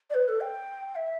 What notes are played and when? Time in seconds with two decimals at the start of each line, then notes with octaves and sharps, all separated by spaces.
0.10 D5
0.14 B4
0.28 A4
0.42 G5
0.95 E5